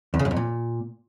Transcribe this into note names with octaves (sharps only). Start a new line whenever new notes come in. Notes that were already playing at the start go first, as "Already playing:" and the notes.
E2
C#3
F#2
F2
A#2